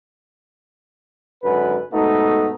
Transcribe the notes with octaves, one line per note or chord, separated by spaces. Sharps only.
G#1 F#2 D3 B4
G#2 B2 A3 B3 D#4